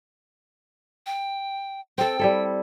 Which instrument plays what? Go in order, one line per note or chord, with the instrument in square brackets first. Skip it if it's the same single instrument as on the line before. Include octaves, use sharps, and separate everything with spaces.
[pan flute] G5
[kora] C4 A4 [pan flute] G5
[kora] G3 E4 A4